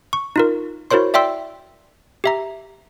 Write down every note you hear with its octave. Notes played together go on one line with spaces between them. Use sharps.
C#6
D#4 F4 A#4
E4 F#4 A#4 C5 C#5 C6
D5 E5 G5 C6 E6
G4 E5 A#5